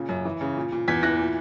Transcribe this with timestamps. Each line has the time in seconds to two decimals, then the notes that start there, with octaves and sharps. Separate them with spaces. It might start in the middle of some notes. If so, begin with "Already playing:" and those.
Already playing: A#2 C#3
0.09 F#2
0.25 E3
0.41 C#3
0.57 A#2
0.72 A#2
0.88 E2 G#6 B6
1.03 E3 F#6 A#6
1.19 A#2